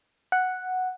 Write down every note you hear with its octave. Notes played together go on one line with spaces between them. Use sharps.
F#5